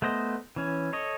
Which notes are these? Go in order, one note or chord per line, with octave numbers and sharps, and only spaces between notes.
A3 B3 C5 D#5
E3 C#4
A4 C#5 D#5